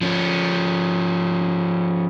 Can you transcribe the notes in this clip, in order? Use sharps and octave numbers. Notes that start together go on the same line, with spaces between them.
F3 C#4